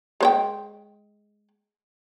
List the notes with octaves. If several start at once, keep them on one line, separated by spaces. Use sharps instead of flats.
G#3 C5 G5